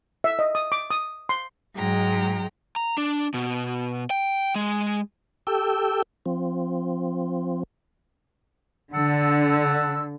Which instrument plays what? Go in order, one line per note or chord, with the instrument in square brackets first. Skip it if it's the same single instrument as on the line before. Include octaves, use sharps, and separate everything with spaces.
[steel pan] E5
D#5
D#6
D6
D#6
C6
[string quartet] G#2 F#3 G#3 G5 A#5
[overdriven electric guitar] A#5
D4
B2
G5
G#3
[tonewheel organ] G4 A4 G5 E6
F3 C4
[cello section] D3 [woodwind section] F#5 A5 E6